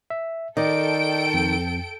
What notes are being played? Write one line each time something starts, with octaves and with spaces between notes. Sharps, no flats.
E5
D#3 A4 D5 D#5 G5 D7
F2